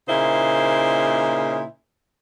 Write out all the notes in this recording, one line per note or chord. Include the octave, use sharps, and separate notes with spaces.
A#2 C#3 A#3 D#4 E4 C5